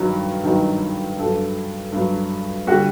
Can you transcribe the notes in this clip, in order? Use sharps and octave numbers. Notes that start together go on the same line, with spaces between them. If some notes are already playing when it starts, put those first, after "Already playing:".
Already playing: G2 D#3 F#3
G2 D#3 F#3
G2 F#3 A4
G2 F#3
D3 G3 F#4